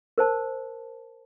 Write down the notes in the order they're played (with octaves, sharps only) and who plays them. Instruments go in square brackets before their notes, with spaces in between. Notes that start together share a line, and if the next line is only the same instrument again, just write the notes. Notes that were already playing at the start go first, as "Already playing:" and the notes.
[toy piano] A#4 C5 A5